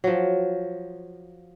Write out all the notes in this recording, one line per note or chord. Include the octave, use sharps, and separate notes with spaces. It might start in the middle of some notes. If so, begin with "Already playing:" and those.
F3 F#3